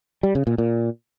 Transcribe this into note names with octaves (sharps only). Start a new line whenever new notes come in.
G3
C#3
A#2
A#2